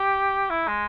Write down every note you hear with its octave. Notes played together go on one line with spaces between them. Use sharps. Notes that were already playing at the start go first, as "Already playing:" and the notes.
Already playing: G4
E4
G#3